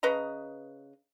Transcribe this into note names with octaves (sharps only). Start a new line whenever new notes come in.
C#3 B4 D#5 A#5